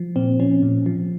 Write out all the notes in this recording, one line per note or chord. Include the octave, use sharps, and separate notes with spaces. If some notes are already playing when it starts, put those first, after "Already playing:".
Already playing: F3
A#2 C4
F3 C#4
A#2
F3